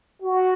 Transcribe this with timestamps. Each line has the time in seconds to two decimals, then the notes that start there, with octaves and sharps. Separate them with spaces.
0.22 F#4